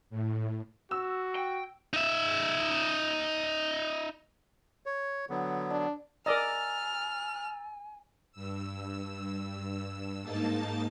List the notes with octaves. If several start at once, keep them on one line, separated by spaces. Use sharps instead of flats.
A2
F#4 E6
G5
D#4 E5
C#5
D3 F#3 B3
D4
A#4 D5 D#5 G#5 A#5 E6 F6 A6
G2 E6
G#2 A#3 D#4 A5 A6